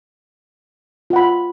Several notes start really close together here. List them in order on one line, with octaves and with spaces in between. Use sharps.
F4 F#5 B5